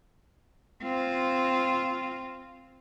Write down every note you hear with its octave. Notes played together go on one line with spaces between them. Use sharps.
C4 F4